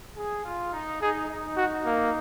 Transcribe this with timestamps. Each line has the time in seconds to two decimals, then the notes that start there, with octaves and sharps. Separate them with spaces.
0.17 G#4
0.45 F4
0.73 D#4
1.01 D#4 G#4
1.29 D#4
1.57 F#4
1.85 A#3